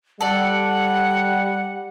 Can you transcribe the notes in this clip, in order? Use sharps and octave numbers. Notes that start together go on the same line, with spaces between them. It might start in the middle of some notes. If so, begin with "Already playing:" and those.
G3 A4 D5 F#5